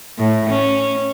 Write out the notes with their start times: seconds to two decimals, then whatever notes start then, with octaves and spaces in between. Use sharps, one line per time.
0.18 A2
0.50 C#4